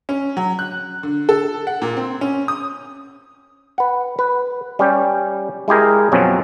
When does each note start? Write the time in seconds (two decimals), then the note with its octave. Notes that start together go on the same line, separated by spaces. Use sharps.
0.09 C#4
0.37 F#3
0.59 F#6
1.03 D3
1.29 A4
1.67 F#5
1.82 A#2
1.97 C4
2.21 C#4
2.48 D#6
3.78 B4 F#5
4.19 B4
4.79 G3 C#4 G4
5.68 G#3 E4 G4 G#4 A#4
6.12 F#2 B2 F3 F#3 C4 C#4